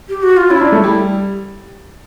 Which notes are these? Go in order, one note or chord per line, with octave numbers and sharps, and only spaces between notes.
G4
F#4
F4
C#4 E4
D4
A3
G3